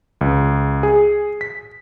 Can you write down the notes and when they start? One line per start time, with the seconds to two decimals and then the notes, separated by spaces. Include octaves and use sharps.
0.21 C#2
0.83 G#4
1.41 B6